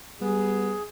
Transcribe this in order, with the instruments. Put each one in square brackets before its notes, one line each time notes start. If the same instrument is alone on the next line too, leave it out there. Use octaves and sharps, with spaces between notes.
[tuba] G3 [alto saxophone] B3 [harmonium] G#4